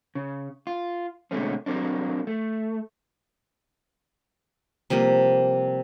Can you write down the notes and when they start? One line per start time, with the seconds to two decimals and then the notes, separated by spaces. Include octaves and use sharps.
0.15 C#3
0.67 F4
1.31 B2 D3 G#3 A3 C4 C#4
1.66 F#3 A#3 C4 D4
2.27 A3
4.90 C3 F3 G3 A#3